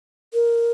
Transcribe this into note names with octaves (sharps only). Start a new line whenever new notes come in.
A#4